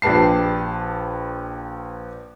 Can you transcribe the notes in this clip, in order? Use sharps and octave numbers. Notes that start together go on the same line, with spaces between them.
A#1 G4 B4 A5 C7